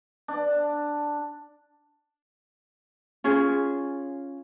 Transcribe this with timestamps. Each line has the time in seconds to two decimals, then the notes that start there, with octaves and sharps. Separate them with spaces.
0.28 D4
3.24 C#4 F4 G#4